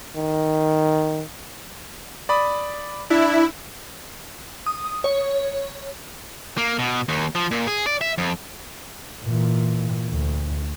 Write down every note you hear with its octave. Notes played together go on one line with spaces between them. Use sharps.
D#3
D5 B5 D#6
D4 E4
D#6
C#5
A#3
B2
D#2
F3
A#2
G#4
D5
E5
F2
A#2 E3
D2